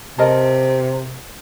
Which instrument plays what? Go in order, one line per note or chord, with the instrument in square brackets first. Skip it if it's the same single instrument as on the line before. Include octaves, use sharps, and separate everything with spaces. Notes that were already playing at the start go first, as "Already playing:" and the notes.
[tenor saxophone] C3 [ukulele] A4 A#4 D#5